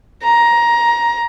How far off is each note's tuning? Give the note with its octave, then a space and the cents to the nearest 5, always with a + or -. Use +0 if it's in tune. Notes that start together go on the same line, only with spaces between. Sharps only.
A#5 +15